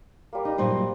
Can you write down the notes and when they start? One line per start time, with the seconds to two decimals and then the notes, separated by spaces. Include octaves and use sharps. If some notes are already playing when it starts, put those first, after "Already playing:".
0.33 G3 A#3
0.45 D#4
0.58 G2 A#2 F#3 C5 C6